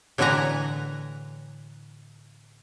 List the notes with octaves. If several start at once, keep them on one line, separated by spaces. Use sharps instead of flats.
A2 D3 E3 B4 G#5 A#5